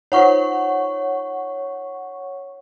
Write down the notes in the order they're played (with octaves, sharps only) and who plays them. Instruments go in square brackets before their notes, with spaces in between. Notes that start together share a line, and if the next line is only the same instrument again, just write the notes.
[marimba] D#4 F4 C5 [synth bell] C#5 F#5 C#6